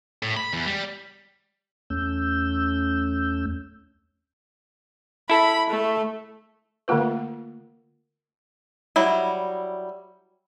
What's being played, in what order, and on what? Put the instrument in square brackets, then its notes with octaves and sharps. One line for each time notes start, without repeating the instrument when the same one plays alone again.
[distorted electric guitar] A2
B5
E2
G3
[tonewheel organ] E2 A3 C#4 E6 G6
[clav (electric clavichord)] E4 A4 [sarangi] B5
[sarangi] A3
[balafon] D3 A3 A#3 F4 B4
[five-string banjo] F#3 G3 E4